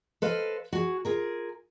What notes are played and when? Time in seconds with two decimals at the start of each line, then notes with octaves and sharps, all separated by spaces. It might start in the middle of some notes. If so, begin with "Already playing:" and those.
0.22 A4 B4 C5 D#5 F5
0.73 F#4 G#4
1.05 F4 G#4 A#4